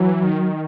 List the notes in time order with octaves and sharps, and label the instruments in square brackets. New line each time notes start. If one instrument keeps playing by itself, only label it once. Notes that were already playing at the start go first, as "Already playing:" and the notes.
Already playing: [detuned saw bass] E3 [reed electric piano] F#3
[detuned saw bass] D#3